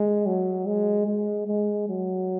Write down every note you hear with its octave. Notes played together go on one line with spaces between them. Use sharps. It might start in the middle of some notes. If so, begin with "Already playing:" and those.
Already playing: G#3
F#3
G#3
G#3
G#3
F#3